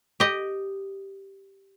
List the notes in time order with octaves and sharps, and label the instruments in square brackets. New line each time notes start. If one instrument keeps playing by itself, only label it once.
[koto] G4 D#5